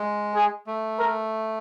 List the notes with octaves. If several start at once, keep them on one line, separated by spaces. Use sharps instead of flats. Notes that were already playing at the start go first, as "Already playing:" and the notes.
Already playing: G#3
G#4
A3
A#4